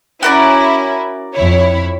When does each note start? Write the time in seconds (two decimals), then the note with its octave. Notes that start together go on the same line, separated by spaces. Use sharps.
0.23 C#4 E4 F#4 A#4 D5
1.34 F2 E4 C#5